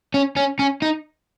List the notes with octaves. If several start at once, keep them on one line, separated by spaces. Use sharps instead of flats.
C#4
C#4
C#4
D#4